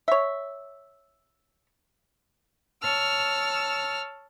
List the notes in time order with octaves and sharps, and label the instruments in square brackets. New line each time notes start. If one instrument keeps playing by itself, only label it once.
[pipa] C#5 E5
[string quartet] C#5 A5 E6 F6